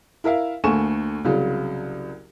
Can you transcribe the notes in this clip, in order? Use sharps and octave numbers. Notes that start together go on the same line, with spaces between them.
E4 A#4 E5 F5
D2 A3 A#3 G#5 C#6 E7
C2 C#3 F#3